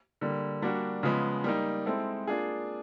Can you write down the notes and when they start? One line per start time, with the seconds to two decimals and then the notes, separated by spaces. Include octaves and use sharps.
0.21 D3 G3 A#3
0.62 G3 A#3 D4 F#4
1.03 C#3 F3 G#3 B3
1.44 G3 A#3 D#4
1.86 G#3 C4 E4 A4
2.27 A#3 D4 F4 G#4